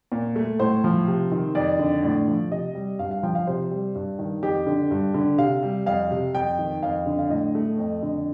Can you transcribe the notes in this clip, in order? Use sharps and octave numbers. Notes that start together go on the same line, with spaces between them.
A#2
A3
A2 C5
F3
C3
D#3
F2 D5
D3
A2 D5
F3
C3 D#5
G3
G2 F5
F5
F3 G5
F5
C3 C5
G3
G2
D#3
F2 G4
D3
G2
D3
C3 F5
G3
F2 F5
C3
F2 G5
D#3
F2 F5
D3
F5
A2 D#5
A3
F2
D3